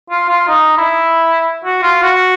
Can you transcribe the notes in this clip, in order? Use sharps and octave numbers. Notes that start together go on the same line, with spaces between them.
F4
F4
D#4
E4
F#4
F4
F#4